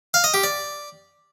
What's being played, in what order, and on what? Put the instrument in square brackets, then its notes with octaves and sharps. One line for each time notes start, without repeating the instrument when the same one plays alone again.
[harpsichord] F5
D#5
G4
D5